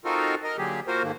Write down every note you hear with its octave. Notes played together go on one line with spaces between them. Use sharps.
C4 D#4 F4 F#4 A4 A#4
A#4 D#5
D3 F#3 A#3 G4 G#4
A#3 F4 F#4 A#4 C5
G#2 D#3 A3 A#3